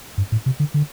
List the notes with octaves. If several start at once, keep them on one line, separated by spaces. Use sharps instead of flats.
G2
A2
C3
D3
D3